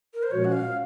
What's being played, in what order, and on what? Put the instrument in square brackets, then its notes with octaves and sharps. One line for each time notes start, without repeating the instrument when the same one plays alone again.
[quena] A#4
C5
[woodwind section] A#2 F3 G#3 C#4 F#4 [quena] C#5
[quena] F#5
F5